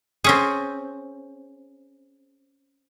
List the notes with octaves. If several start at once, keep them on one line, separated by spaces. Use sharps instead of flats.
C4 C#4 G#4